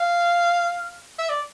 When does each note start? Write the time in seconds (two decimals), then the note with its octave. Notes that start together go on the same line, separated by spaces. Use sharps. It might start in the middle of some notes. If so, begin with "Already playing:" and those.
Already playing: F5
1.18 E5
1.29 D5